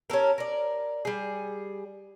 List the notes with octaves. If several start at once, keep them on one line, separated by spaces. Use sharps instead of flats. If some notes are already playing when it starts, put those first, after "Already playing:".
C#4 G4 A4 A#4
A#4 D5
G3 G#4